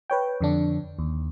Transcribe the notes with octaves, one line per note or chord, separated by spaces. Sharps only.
B4 C#5 G5
F2 D3 D4
D#2